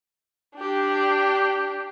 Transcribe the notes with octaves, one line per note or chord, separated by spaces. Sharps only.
D4 G4